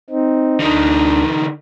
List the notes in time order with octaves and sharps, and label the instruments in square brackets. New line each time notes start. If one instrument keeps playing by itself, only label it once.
[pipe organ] C4 D#4
[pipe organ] D2 D4 [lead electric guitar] D3 D#4